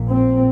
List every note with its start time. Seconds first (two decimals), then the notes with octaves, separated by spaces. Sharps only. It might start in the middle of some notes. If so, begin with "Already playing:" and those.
Already playing: A#1 A#2
0.10 C4